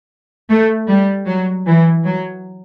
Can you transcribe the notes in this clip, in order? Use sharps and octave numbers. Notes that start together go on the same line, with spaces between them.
A3
G3
F#3
E3
F#3